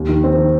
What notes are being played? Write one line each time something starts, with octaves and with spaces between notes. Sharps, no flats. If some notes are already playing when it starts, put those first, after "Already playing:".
Already playing: D#2
D#3
C4
D#3